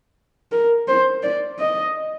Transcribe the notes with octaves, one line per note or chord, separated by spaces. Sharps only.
A#4
C5
D5
D#5